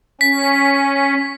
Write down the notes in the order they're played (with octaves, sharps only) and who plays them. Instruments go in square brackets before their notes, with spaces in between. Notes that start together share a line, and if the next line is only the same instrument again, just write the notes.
[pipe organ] C#4 [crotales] B6